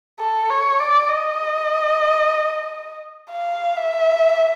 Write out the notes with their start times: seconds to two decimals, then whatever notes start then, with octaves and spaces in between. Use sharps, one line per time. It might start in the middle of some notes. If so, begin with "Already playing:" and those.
0.20 A4
0.50 C#5
0.80 D5
1.08 D#5
3.31 F5
3.76 E5